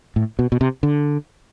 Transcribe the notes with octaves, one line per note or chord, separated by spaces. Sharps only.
A2
B2
B2
C3
D3